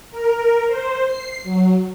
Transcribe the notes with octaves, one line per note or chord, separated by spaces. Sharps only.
A#4
C5
C7
F#3